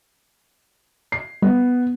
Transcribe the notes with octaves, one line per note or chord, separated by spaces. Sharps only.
C7
G3 B3